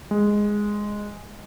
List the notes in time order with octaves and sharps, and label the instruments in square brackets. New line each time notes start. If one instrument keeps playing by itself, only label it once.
[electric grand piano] G#3